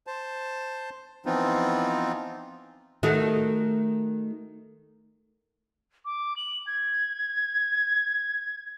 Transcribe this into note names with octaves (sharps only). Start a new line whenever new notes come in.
C5 A5
E3 F3 B3 C4 D#4 F4
D#3 A3 F#4
D6
F#7
G#6